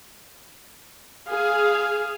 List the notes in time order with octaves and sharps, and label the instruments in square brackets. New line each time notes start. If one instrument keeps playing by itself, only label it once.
[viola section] G#4 [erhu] F5